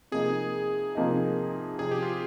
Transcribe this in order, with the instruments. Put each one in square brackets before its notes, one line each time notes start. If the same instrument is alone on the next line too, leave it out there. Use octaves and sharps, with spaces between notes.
[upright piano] C3 F3 A#3 D#4 [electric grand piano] G#4
[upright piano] C3 F3 A#3 D#4
[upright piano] C3 F3 C4 [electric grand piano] G#4
[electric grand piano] G4
F4